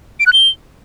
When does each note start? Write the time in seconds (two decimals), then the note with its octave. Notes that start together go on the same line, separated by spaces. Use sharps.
0.20 D7
0.26 F#6
0.33 G7